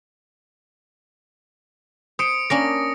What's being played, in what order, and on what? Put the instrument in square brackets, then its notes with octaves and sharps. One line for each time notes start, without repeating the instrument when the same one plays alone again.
[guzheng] C5 [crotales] D#6 C#7 D7
[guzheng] A#3 C#4 D4 [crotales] A#6